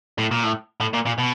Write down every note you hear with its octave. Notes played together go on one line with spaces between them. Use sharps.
A2
A#2
A2
A2
A#2
A#2
B2